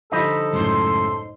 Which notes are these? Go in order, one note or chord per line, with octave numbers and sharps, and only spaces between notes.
D3 F3 G3 D#4 A4 C5 D#5 B5
C#2 F#2 A2 C6